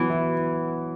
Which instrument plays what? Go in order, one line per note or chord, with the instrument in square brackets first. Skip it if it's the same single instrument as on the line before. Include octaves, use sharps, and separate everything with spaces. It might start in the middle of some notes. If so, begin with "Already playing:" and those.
Already playing: [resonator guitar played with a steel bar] E3 [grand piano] F#3 B3
[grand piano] E4